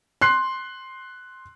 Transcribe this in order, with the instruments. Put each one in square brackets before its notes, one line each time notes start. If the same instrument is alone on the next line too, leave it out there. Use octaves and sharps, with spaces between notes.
[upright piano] C6 F#6 C7